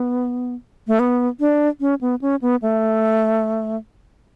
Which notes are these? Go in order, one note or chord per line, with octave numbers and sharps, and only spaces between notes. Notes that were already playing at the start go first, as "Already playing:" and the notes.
Already playing: B3
A3
B3
D4
C#4
B3
C#4
B3
A3